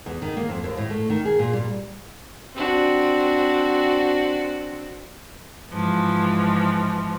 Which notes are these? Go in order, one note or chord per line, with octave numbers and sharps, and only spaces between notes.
E2
D#3
A#3
F2
D#2
A2
A3
D#3
G#4
A#2
G3
C4 D4 F#4
G#2 E3 F3